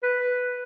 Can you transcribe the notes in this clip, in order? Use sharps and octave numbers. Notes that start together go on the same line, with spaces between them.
B4